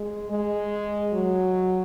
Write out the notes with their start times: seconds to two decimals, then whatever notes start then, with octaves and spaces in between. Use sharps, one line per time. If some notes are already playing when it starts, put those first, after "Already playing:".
Already playing: G#3
0.31 G#3
1.13 F#3